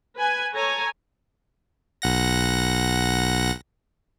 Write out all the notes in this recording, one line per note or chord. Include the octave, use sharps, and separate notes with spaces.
B4 G#5
A4 C#5 G#5 A#5
B1 F#5 A#6